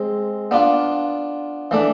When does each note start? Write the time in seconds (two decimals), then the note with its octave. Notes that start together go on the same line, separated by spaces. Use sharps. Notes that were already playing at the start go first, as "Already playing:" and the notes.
Already playing: G#3 C4
0.51 B3 D4 F4
1.71 E3 A3 D4